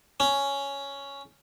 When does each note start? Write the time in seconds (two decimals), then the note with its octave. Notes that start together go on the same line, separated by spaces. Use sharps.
0.20 C#4